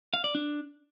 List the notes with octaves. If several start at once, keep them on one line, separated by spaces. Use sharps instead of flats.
F5
D5
D4